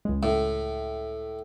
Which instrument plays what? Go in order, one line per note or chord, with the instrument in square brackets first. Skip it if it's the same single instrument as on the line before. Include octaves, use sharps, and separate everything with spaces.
[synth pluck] C#2 G#3
[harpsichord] A2